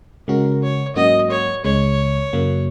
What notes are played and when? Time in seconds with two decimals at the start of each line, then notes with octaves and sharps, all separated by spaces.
0.27 C#3 G#3 C#4 F#4 A#4
0.62 C#5
0.96 G#2 F#3 A#3 C#4 F#4 D#5
1.30 C#5
1.64 C#2 C#3 G#3 C#5
2.33 F#2 C#3 F#3 A#3